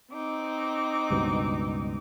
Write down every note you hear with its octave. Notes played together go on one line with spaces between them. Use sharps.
C4 D#4 D6
C#2 G2 B2